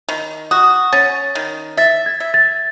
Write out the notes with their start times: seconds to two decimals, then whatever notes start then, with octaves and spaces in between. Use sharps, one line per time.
0.09 D#3
0.51 F#4 D#6
0.92 C#4 A6
1.35 D#3
1.77 E5 A6
2.06 G#6
2.20 E5
2.34 A6